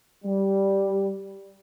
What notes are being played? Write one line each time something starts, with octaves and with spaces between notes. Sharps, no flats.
G3